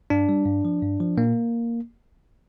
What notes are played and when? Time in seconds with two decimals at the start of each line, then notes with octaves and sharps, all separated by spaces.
0.10 G2 D4
0.29 G3
0.46 G2
0.65 F3
0.82 G2
1.00 F3
1.17 A#2 A#3